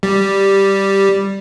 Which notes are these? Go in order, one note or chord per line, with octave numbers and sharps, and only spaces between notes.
G3